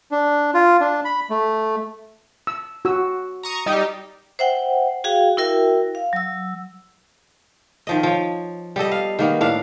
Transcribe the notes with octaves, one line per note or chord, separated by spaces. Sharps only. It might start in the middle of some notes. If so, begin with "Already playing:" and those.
D4
F4
D4
B5
A3
E6
F#4 E6
A#5 C#6 D#6
G3 D#4 G4 D#5
C5 E5 F#5 G5
F#4 G#4 F5 G5
E4 F#4 A#4 E5 G5
F5
F#3 E6
D#3 F3 D#5
F3 C#5
G3 B3 A4 D#5
F5
D#3 A#3 B3
A2 D4 F5